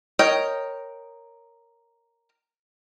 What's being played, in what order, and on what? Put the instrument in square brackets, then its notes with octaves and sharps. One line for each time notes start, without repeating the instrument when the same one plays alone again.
[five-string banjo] A#4 C#5 D#5 G5